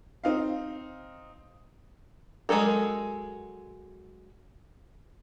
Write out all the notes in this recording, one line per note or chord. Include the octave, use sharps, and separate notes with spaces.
C4 D#4 F5
F#3 G#3 C#4 A4 A#4